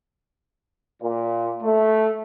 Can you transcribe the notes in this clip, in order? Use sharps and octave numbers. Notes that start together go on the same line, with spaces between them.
A#2
A3